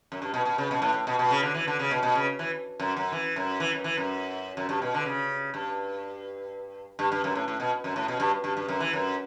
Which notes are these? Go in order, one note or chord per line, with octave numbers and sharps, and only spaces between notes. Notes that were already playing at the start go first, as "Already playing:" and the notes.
F#2
G2
B2
B2
C#3
B2
A2
A2
B2
B2
C#3
D3
E3
D3
C#3
B2
B2
C#3
E3
F#2
F#2
E3
F#2
E3
F#2
E3
F#2
F#2
G2
B2
D3
C#3
G2
G2
G2
F#2
A2
A2
B2
F#2
A2
B2
G2
G2
G2
F#2
E3
F#2